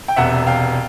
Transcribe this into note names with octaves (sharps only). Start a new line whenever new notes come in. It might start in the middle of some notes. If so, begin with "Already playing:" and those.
G5
E1 E2 C3 E5 F#5
F5 G5